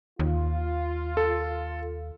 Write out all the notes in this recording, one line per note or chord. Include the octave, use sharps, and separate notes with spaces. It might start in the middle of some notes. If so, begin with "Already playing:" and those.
D#2 F4
A4